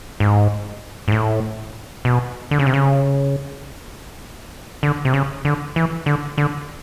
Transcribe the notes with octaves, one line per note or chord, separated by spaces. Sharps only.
G#2
G#2
A2
B2
D3
C#3
C3
C#3
D3
C3
C#3
D3
E3
D3
D3